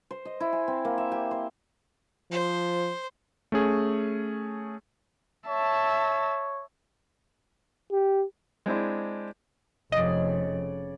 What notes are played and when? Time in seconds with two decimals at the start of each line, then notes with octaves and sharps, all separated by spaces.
0.11 C5
0.25 D#5
0.40 E4
0.53 G#5
0.68 C4
0.85 A#3
0.98 E5
1.12 G4
1.31 C5
2.31 F3 C5
3.52 A3 C#4 G#4
5.49 C#5 E5 A5
7.92 G4
8.66 G#3 C4 D4 E4
9.92 F1 F2 C#3 D5 D#5